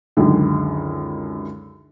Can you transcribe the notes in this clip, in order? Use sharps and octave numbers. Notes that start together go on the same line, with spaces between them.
C#2 F#2 D3 D#3